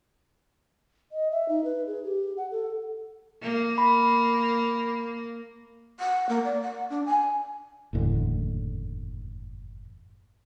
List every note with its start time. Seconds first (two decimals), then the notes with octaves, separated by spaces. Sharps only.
1.12 D#5
1.32 E5
1.49 D#4
1.64 B4
1.86 G#4
2.04 G4
2.37 F#5
2.51 A4
3.42 A#3
3.78 B5
6.00 F#5
6.29 A#3
6.45 D5
6.61 F#5
6.90 D4
7.06 G#5
7.93 F#1 E2 A2 D3